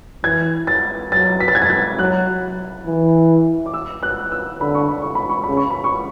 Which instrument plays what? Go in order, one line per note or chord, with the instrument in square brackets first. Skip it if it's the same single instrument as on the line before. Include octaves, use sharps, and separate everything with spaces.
[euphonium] E3 [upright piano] G#6
[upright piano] A6
[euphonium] F#3 [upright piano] A6
[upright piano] B6
A6
G#6
A6
G#6
[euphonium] F#3 [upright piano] F#6
[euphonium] E3
[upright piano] D6
E6
F#6
E6
[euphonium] D3 [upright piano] B5
[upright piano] C#6
B5
C#6
B5
C#6
[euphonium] C#3 [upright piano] B5
[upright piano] C#6
B5
C#6